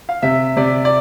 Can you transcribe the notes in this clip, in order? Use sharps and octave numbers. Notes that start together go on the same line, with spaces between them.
F5
C3 E5
C3 D5
D5